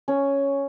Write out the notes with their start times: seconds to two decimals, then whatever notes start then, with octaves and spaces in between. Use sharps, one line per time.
0.08 C#4